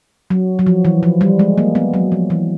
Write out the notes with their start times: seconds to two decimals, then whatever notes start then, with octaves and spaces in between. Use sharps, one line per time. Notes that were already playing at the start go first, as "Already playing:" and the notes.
0.30 F#3
0.59 F#3
0.66 F3
0.85 E3
1.03 F3
1.21 G3
1.39 G#3
1.58 A#3
1.75 B3
1.94 F#3
2.12 F3
2.30 E3